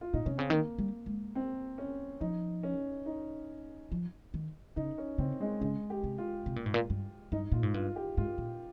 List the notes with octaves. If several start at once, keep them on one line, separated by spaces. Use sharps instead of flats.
F4
A#2 D#4
C3 C#4
C#3 C4
D#3 A#3
G3
G#3
C4
C#4
F3 D#4
C#4
D#4
F3
D#3
C#3 D#4
C#4
C#3 C4
G#3
C#3 G#3
G4
C3
F4
C3
A#2
G#2
A#2
G2
G2 D#4
A#2 F4
G#2
G2 F4
G4
G#2 F4
A#2